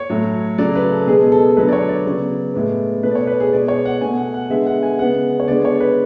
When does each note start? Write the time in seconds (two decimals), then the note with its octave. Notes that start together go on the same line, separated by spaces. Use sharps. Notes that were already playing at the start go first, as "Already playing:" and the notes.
Already playing: C#5
0.10 A2 F#3 A3
0.58 C#3 F#3 A3 D5
0.75 B4
0.92 A4
1.07 B2 G#3 B3 G#4
1.20 A4
1.32 A4
1.56 D3 F#3 A3 B4
1.68 D5
1.73 C#5
1.89 D5
2.06 C#3 F#3 B3
2.54 A2 G#3 B3
3.03 B2 A3 B4
3.11 D5
3.15 C#5
3.27 B4
3.40 G#4
3.52 B2 G#3 B3 D5
3.68 C#5
3.85 F#5
4.01 B2 A3 G#5
4.17 F#5
4.34 F#5
4.50 D3 G#3 B3 E5
4.66 F#5
4.83 G#5
4.99 C#3 G#3 B3 F#5
5.40 C#5
5.48 D3 G#3 B3 D5
5.65 C#5
5.80 B4